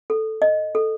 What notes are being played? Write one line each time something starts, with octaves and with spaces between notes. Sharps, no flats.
A4
D#5
A4